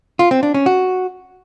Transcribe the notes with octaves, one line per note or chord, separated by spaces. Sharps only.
F4
C4
D4
C#4
F#4